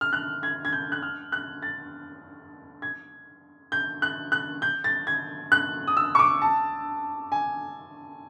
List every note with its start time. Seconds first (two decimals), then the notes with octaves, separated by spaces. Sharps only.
0.01 F6
0.13 F#6
0.43 G#6
0.65 G#6
0.73 G6
0.92 F#6
1.03 F6
1.32 F#6
1.62 A6
2.82 G#6
3.72 G6
4.02 F#6
4.32 F#6
4.62 G6
4.84 A6
5.07 G#6
5.52 F#6
5.87 D#6
5.97 E6
6.15 C#6
6.19 D6
6.42 A5
7.32 G#5